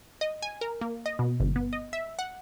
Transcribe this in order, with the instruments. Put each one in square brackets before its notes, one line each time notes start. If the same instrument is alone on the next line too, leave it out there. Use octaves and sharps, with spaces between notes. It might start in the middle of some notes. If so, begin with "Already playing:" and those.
[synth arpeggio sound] D#5
G#5
A#4
A#3
D#5
B2
G1
B3
D#5
E5
F#5